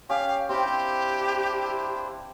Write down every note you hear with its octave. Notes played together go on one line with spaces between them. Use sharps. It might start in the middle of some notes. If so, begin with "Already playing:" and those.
C#4 G4 F5
C4 D4 E4 G4 C5 F5